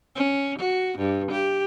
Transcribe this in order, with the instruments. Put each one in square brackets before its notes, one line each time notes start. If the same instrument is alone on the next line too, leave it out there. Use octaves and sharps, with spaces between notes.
[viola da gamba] C#4
F#4
G2
G4